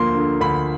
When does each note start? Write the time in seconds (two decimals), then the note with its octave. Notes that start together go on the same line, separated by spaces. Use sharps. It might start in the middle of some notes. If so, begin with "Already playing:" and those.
Already playing: D2 D3 F3 A#3 C6
0.15 D3
0.41 D2 B5